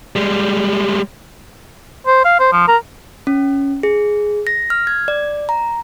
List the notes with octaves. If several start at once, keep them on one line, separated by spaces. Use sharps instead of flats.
G3 G#3
C5
F5
C5
F3
A#4
C#4
G#4
A#6
F6
G#6
D5
A#5